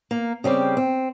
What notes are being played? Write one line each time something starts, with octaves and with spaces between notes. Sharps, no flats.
A#3
C#3 G3 C4 G4
C4